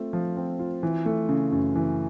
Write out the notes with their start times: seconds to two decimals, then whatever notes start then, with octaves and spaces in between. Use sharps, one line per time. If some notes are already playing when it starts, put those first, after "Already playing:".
Already playing: A3 C4 F4
0.13 F3
0.37 C4
0.59 F4
0.83 E3
1.06 A3
1.29 C#3
1.52 F#2
1.76 E3